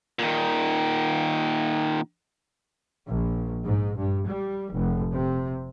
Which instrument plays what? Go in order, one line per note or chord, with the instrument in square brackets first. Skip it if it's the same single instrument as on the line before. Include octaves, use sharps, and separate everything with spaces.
[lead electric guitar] A#2 D#3
[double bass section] A#1
G#2
G2
G3
F1
C3